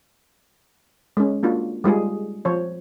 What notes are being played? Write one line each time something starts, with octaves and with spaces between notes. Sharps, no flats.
G#3 C#4
A#3 D4 F4 F#4
G3 G#3 F4 G#4
F3 C5 C#5